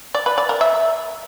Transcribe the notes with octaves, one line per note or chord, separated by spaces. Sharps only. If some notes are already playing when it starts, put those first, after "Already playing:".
D5
B4
D5
A#4
E5